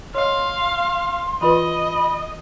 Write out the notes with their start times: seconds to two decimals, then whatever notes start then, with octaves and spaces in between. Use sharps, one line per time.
0.15 C#5 D#5 F5 C6
1.41 E3 F4 B4 D#5 B5